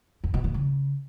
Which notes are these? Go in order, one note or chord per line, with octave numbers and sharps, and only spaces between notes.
F2
B2
A#2
C#3